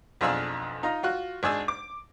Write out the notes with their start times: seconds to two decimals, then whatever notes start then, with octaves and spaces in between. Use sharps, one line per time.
0.21 B1 F2 D4 G#4 F5 E6
0.83 D#4 F4 A#5
1.03 F4 F#4 F#6
1.43 G#1 D4 G#4 E6
1.68 D6